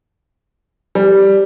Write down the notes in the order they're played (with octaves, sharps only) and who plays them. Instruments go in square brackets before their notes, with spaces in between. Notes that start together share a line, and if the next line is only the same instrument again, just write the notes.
[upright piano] G3